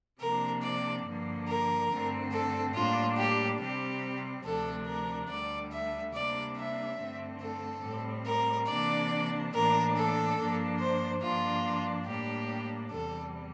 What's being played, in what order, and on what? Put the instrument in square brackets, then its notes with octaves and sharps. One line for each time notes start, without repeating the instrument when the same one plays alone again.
[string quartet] C3 F3 A#3 D4 A#4
D5
G2 D3 F3 A#3
A#4
G2 D3 A3 C4
A4
A2 G3 A#3 D4 F4
G4
C3 G3 C4 G4
D2 C3 F3 A3 D4 A4
A#4
D2 D3 G3 D5
E5
C3 G3 A#3 D4 D5
E5
G2 D3 A3 C4
A4
A2 G3 C4
A#4
C3 E3 A#3 D4 D5
A2 E3 A#3 D4 A#4
A4
G2 F3 A#3 D4
C5
G2 F3 A#3 D4 F4
A2 G3 A#3 D4 G4
E2 C3 G3 A4